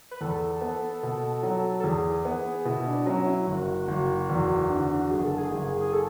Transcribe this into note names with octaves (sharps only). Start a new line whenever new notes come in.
B4
E2 A4
B3
B2
F#3
A4
E2 G#4
B3
B2 E4
D4
F#3 C#4
E4
F#1 F#4
F#1
E2
D3
F#1 G#4
A4
G#4
F#1
G#4
A4